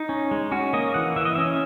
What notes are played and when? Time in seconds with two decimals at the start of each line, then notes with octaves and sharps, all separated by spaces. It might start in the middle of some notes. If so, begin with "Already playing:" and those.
Already playing: D#4
0.09 C#4
0.31 G#3
0.52 C#4 F#4
0.73 A#3 D#5
0.94 E3 F#5
1.16 E3 E5
1.25 D#5
1.35 C#4 E5